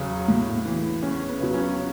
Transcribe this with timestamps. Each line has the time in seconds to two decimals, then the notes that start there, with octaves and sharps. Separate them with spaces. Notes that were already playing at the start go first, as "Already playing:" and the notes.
Already playing: E2 C#3 F#3
0.28 A2
0.65 E3
1.02 E2 C#4
1.29 B3
1.40 C#3 F#3
1.54 C#4